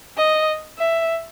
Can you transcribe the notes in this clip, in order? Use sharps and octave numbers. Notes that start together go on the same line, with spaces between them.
D#5
E5